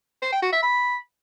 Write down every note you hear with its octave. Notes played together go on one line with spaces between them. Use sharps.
C5
G5
F#4
E5
B5